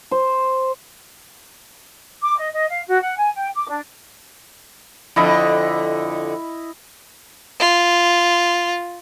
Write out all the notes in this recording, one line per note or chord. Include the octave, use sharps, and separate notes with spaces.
C5
D6
D#5
D#5
F5
F#4
F#5
G#5
G5
D6
D4
F2 D3 E4 D#5 B5
F4